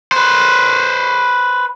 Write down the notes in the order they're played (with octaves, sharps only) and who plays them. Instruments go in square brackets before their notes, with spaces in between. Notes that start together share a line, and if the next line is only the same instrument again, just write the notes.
[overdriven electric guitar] B4 C5